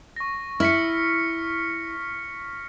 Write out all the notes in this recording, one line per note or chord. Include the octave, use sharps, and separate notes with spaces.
C#6 A#6
E4 F6 B6 C#7